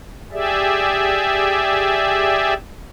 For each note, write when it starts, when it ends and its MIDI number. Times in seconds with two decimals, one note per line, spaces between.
0.32 2.54 67
0.32 2.54 68
0.32 2.54 74
0.32 2.54 76